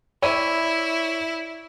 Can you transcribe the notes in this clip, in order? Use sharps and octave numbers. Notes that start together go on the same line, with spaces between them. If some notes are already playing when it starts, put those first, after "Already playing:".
E4 C#5 D5 E5 B5 E6 D#7